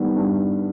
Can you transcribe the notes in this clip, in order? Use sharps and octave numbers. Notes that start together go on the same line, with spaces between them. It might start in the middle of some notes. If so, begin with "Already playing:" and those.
Already playing: D#3 G3 B3
G2